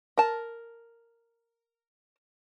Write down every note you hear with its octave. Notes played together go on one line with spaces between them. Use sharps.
A#4 A5